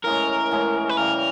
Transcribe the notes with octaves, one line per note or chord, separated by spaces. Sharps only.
A2 E3 G#3 C#4 A#4
A2 E3 G#3 C#4
B4
C#3 E3 G3 A#4